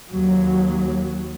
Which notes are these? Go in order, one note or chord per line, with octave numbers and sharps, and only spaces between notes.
D#2 F#3